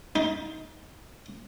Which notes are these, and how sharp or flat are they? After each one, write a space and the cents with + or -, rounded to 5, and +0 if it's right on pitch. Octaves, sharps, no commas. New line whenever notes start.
D#4 +25